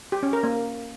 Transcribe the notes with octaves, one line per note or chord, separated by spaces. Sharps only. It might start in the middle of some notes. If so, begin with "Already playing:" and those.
G4
C#4
A#4
A#3